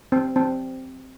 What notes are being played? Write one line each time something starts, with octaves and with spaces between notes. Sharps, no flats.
C4
C4